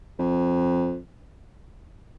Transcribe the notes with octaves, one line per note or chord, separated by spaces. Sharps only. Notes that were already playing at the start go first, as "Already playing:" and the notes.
F2